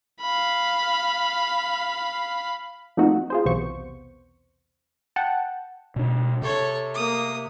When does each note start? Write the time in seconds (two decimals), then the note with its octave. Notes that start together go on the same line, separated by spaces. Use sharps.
0.21 F5 B5
2.97 F3 A3 A#3 C4 D#4 F#4
3.30 F4 G#4 C5
3.45 B1 E2 C3 B3 C5 C#6
5.16 F#5 G5 A5
5.96 B2 D4
6.42 C3 A4 C#5
6.95 A#3 D#6